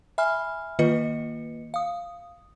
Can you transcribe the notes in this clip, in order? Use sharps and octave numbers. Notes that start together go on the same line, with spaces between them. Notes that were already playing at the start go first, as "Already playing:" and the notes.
E5 G#5 B5 F6
D#3 A#3 F4 B4 D#5 C#7
F5 D#6